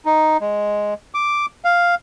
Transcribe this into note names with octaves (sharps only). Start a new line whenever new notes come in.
D#4
G#3
D6
F5